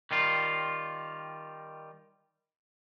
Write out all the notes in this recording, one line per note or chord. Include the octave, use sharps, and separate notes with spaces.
D#3 G3 F4